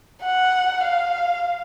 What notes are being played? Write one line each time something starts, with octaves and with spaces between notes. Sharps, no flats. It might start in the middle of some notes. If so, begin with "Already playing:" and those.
F#5
F5